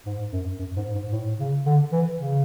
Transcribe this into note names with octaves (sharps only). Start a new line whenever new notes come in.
G#2
F#2
F#2
G#2
G#2
A2
C#3
D3
E3
C#3